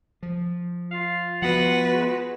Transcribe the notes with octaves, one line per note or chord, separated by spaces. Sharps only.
F3
F4 F5
F3 B3 F#4 B4 F#5
G#3